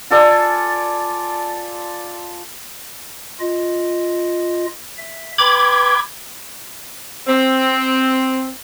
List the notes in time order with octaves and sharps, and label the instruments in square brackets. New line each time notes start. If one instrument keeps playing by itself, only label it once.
[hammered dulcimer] F4 A4 D5 G#5
[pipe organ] F4 D#5
E5
[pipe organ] B4 G5 C6 [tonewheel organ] B5 D6 G#6
[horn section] C4